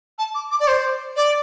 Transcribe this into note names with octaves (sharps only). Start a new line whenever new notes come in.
A5
D6
D6
D5
C5
D5